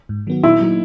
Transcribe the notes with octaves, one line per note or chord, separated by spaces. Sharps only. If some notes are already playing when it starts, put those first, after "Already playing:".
G#2
D#3 F#3 B3 F#4
A#2 E4
F#3 A#3 D#4